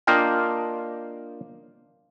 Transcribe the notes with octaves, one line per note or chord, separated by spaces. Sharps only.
A#3 D4 F4 D#5 F5 G5